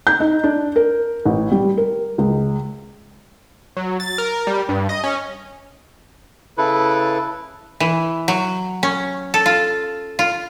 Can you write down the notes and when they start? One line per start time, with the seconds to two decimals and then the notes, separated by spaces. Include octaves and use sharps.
0.07 G6
0.20 D#4
0.44 D4
0.76 A#4
1.25 A1
1.52 G3
1.77 A#4
2.18 C#2
3.77 F#3
4.00 A6
4.18 A#4
4.47 G3
4.69 G2
4.89 D#5
5.04 C#4
6.58 C#3 E4 A4 B4
7.80 E3
8.28 F#3
8.83 C#4
9.34 A4
9.46 F4
10.19 F4